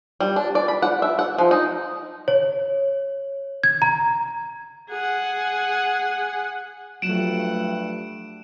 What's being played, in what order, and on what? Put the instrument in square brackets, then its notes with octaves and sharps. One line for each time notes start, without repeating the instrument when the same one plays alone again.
[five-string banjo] G3
D4
D5
B5
F#5
E5
F#5
F3
D#4
[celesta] C#5
G#6
A#5
[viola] G#4 F#5
[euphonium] G2 [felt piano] F3 F#3 [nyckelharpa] A3 F#5 [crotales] D7 E7